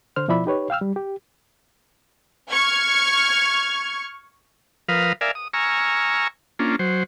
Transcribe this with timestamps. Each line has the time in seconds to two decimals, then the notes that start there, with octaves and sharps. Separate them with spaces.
0.16 D3 C5 F6
0.28 B2 F3 E4 D5 E5 B5
0.46 D#4 G4 B4 C#5
0.70 F5 G5 E6 F6
0.81 G3
0.96 G4
2.51 C#6 F6 G#6
4.89 F3 A#4 B4 F5 D#6
5.21 A#4 D5 E5 F5 G#5
5.35 D#6
5.54 G#5 A#5 C#6 E6 F6
6.59 A#3 C#4 D4 F4
6.79 F#3 C5